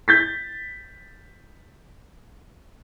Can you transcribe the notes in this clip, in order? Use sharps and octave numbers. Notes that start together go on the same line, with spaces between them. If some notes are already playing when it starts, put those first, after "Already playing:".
G6 A6 B6